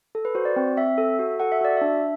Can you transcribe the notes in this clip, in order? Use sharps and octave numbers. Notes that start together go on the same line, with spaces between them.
A4
B4
F#4 C5
D5
C4
C4 E5
A4
F#4
A4 F#5
E5
F#4 D5
D4 E5